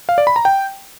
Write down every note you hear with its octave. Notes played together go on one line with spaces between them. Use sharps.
F5
D5
B5
A#5
G5